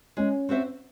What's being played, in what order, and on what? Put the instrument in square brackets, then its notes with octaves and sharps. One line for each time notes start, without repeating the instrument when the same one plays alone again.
[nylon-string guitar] G#3 [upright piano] C#4
[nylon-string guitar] C4 F#4 C5 E5